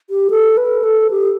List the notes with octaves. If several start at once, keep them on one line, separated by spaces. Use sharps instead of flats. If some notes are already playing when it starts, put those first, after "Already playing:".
G4
A4
B4
A4
G4